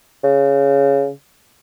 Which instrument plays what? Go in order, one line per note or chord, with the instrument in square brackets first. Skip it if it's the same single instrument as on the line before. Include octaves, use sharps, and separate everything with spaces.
[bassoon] C#3